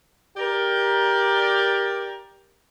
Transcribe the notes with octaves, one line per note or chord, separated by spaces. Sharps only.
G4 A#4 D5